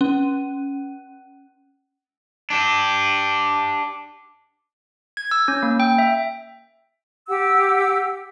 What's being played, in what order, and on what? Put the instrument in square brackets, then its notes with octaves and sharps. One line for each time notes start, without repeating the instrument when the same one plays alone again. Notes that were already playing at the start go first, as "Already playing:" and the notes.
[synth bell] C#4
[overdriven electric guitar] D4 G4
[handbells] G#6
E6
C#4
A#3
G5
E5
[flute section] G4 F#5 E6